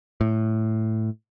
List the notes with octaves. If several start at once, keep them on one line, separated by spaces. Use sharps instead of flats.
A2